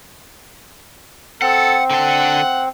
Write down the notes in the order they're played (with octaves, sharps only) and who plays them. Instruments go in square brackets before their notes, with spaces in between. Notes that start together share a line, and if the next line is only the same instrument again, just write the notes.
[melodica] C4 [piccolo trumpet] A4 [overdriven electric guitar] F#5
[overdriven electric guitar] D3 A4 [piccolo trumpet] F#5